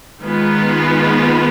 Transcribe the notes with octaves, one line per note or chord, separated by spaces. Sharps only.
D#3 G#3 B3 F4 B4